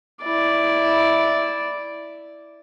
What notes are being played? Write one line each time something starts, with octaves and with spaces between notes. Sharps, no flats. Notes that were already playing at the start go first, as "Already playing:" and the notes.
E4 D5